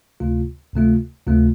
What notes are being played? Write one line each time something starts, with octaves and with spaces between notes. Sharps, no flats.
D2 C3 A3 F4
D2 C3 A3 F4
D2 C3 A3 F4